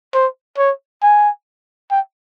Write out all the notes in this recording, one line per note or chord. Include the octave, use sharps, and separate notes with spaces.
C5
C#5
G#5
G5